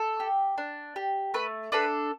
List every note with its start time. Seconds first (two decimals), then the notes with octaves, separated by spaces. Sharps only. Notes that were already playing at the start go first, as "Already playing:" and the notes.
Already playing: A4
0.20 G4
0.58 D4
0.96 G4
1.34 A3 B4
1.72 D4 A4 B4